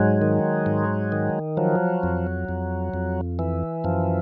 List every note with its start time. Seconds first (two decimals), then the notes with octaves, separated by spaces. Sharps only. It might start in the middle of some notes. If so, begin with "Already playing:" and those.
Already playing: G#2 F#3 G#3
0.21 D#3
0.66 G#2
1.12 D#3
1.57 F3 F#3
2.03 F2
2.49 F2
2.94 F2
3.39 E3
3.84 F#2 F3